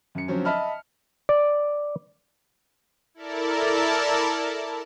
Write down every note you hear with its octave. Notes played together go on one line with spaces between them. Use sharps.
F#2 C#7
D3 F3 F#3 C4 C#4
D#5 E5 A5 B5 F6
D5
E4 A4 A#4 D5 A5